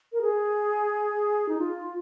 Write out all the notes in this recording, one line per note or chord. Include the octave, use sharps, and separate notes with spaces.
A#4
G#4
D#4
F4